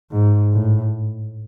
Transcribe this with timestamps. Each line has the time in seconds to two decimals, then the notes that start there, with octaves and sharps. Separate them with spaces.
0.12 G#2
0.53 A2